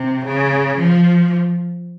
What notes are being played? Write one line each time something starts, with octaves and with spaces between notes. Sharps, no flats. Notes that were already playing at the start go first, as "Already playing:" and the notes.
Already playing: C3
C#3
F3